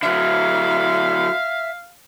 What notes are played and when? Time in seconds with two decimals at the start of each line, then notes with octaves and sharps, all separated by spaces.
0.03 D3 F#3 E5 F5